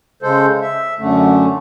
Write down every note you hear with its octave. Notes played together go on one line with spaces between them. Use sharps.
C#3 G#3 A4 C5
E5
F#2 D3 A3